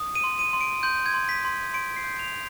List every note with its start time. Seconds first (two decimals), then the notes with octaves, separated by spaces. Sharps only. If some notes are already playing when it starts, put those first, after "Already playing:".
Already playing: D#6
0.15 D#7
0.24 C6
0.39 D#7
0.53 C6
0.61 D7
0.83 C6 G6
1.06 G#6
1.14 C6
1.29 B6
1.45 C6
1.74 C6 D7
1.96 C7
2.04 G6
2.19 F7